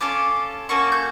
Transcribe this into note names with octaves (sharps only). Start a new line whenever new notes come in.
C#4 F4 A4 D6
A#3 C#4 F#4 A4 C#6
G6